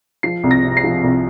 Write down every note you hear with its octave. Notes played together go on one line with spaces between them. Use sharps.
F3 C7
C2
A#6
C3
C7
F3
C2